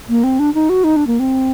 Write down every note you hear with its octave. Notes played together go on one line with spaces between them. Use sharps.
A#3
C4
D4
D#4
F#4
D#4
D4
A#3
C4